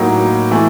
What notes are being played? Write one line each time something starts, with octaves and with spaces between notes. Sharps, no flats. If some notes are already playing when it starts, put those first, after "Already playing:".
Already playing: A2 F#3 A#3 D#4 F#4
E3 A3